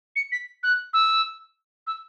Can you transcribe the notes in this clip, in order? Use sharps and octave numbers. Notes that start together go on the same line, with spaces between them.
C#7
B6
F#6
E6
E6